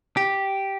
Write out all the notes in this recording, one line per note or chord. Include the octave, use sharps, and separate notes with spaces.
G4